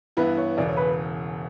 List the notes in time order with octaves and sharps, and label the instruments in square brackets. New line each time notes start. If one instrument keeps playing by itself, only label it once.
[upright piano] G2 E3 B3 E4 [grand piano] B4
[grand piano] C#5
[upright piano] E1 E2 C#3 [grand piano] D5
[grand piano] C#5
B4